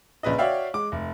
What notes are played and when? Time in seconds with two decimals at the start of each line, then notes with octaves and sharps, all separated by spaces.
0.23 A#1 C#3 B4 D#5
0.38 F#4 C#5 D5 E5 F5 G5
0.74 G#3 D6
0.92 F1